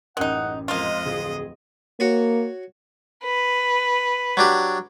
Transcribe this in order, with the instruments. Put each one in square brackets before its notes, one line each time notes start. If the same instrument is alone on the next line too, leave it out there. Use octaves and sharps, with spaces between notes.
[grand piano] A1 F#2 A#4 [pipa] G#3 D#4 [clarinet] F#5
[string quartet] F2 D#5 [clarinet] G#3 [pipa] A#3 F4
[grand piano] D1 [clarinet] G#4
[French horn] A#3 [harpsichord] F#4 C#5
[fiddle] B4
[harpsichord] F#3 D4 G4